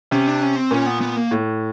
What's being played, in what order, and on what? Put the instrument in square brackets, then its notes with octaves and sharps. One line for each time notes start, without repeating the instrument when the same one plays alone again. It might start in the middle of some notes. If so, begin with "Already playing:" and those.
[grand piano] C3 [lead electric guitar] C#4
[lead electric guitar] D4
C#4
C4
[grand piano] A#2 [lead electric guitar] C#4
[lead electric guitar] B3
B3
A#3
[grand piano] A2